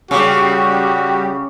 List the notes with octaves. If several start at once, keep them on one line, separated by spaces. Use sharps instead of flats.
C#3 G3 C#4 F#4 G4 D6